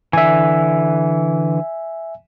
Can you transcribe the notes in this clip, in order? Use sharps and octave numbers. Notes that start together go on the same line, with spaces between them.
D3 E3 E5 G#5